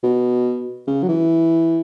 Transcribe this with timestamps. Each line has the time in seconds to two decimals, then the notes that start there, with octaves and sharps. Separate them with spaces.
0.03 B2
0.87 C#3
1.03 F#3
1.09 E3